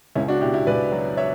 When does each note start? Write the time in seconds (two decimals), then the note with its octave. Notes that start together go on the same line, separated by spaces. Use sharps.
0.16 C#2 C#4 E4
0.28 D4 F#4
0.41 B2 E4 G4
0.54 E4 G4
0.67 C#2 B4 D5
0.92 F#3
1.17 C#5 E5